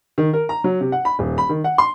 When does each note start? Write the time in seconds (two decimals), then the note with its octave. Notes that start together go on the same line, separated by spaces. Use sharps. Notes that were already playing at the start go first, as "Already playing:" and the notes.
0.18 D#3
0.33 A#4
0.49 A#5
0.64 F#3
0.81 C3
0.92 F#5
1.05 B5
1.19 D#1
1.38 B5
1.49 D#3
1.64 F#5
1.78 C6